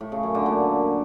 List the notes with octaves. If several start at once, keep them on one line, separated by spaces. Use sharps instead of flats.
A2
C#3
F#2
D3
A#2